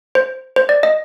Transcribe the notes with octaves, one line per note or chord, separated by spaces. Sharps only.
C5
C5
D5
D#5